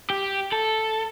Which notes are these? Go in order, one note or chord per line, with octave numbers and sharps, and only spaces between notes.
G4
A4